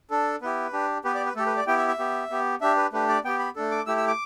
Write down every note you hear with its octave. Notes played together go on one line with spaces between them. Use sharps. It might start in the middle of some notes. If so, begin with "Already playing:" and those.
D4 A4
B3 E4 G4 B4
D4 G4
B3 G4 B4
D5
B4
A3 G4 A4
B4
D5
B3 E4 G4 G5
E5
E5
B3 G4
B3 G4
D4 G4 E5
B4
A3 D4 G4 B4
D5
B3 G4 G5
B5
A3 D4 A4
D6
A3 E4 G4 E6
E6
D6